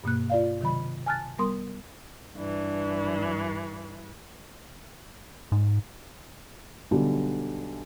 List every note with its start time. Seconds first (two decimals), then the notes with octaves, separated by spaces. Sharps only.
0.04 G2 B2 A#3 F#6
0.30 F4 D5 F5
0.61 C3 D#3 F#3 B5
1.06 G#5 A5 F6 F#6 A6
1.39 G3 B3 A#4 C6 D#6
2.37 G2 E3 D4
5.52 G#2
6.91 B1 D3 G3